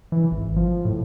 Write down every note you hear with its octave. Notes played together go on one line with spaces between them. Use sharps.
E3
G#1
F3
A2